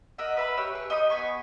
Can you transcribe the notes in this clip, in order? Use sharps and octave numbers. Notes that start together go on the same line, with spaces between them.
A#4 D#5 E5 F#5
B4 E5 B5
G4 C#5 E6 F#6
G#4 C#6
D#4 G4 B5 D#6
B3 G#5 B5 C#6